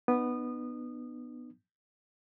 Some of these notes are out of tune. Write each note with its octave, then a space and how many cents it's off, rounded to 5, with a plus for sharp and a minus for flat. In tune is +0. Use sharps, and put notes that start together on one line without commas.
B3 +0 D#4 -45 D#6 -25